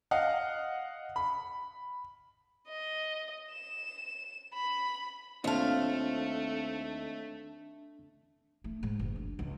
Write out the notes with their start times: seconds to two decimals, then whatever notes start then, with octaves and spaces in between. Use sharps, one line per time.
0.11 D#5 F5 F#5
1.16 B5
2.68 D#5
3.52 E7
4.54 B5
5.44 D#2 A3 C4 D4 F4 F5 A5
8.64 A3
8.83 G#2
8.99 F#1
9.16 D4
9.39 C#2